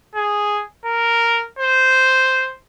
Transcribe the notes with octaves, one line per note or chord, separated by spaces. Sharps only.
G#4
A#4
C5